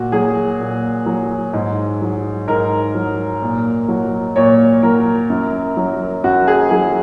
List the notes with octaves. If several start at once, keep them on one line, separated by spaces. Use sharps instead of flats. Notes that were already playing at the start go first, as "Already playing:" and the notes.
Already playing: A#2 F#4
F#3 G#4
A#2
F#3
G#2
F#3
G#2 A#4
F#3
A#2
F#3
A#2 C#5
F#3 A#4
F#2
F#3
F#2 F#4
G#4
F#3 G#4